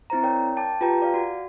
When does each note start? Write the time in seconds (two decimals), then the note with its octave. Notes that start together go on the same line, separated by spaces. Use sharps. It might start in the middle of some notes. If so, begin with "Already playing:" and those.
0.10 C4 E4 C5 A#5
0.23 A#4 C#5 D5 G5
0.56 G5 A5 D6
0.81 F4 G4 B4 G5 A#5
1.02 D5 F5
1.14 F#4